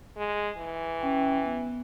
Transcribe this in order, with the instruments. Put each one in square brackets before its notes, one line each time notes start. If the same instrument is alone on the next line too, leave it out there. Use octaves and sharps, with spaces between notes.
[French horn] G#3
E3
[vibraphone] C#4 G5
B3